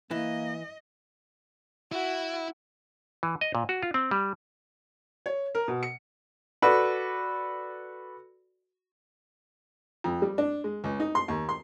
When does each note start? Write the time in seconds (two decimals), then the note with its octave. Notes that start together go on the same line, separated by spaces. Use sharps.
0.11 E3 A#3 D#5
1.92 E4 F#4
3.23 E3
3.41 D#5
3.55 A#2
3.69 F#4
3.83 F4
3.94 C4
4.11 G3
5.26 C#5
5.55 A#4
5.68 B2
5.83 C#7
6.62 F#4 A4 B4 D5
10.04 F2
10.22 G3
10.38 D4
10.64 G#3
10.84 C#2
11.00 D#4
11.15 C6
11.28 D#2
11.49 C6